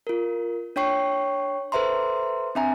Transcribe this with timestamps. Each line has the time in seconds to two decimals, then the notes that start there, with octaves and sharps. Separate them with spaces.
0.07 F4 A#4
0.76 D4 C#5 G5 C#6 C7
1.72 A4 B4 C5 E5 A#5 C6
2.55 C4 D4 E5 G#5 A#5